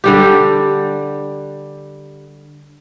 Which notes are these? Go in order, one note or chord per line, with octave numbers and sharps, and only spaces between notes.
D3 G3 G4